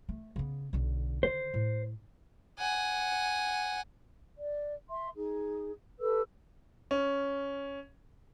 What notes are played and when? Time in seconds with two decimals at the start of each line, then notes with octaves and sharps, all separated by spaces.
0.09 A3
0.36 C#3 B3
0.73 B1 D3
1.23 D3 D#3 C5
1.54 A2
2.59 F#5 G#5
4.37 D5
4.89 E5 C6
5.16 D#4 G#4
6.00 G4 A4 B4 E6
6.91 C#4